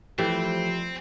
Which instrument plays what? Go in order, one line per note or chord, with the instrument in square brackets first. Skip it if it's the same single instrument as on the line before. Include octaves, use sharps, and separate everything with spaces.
[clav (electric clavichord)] E3 A3 E4 [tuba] F3 [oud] G3 [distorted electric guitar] C4